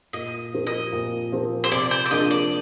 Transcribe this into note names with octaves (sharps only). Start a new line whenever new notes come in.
A#2 D#5
F3 C4 G4 A#4
D#5
A#2
F3 C4 G4 A#4
C5
C3 D5
C5
D5
F3 A#3 D4 G#4 D#5
D5